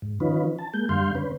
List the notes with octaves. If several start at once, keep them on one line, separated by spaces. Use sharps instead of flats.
G#2
D#3 F3 C#4 D#4 F4 B4
A5
G#3 A#3 G6
F#2 D3 G3 F5 C6 G6
D3 C#4 B4